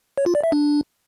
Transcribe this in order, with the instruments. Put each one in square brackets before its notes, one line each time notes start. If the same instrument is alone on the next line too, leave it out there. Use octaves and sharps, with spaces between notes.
[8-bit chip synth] C#5
F4
D5
E5
D4